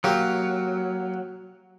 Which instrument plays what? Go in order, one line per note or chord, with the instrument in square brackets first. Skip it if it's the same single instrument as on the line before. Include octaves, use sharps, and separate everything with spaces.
[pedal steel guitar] F#3 [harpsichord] A#3 G4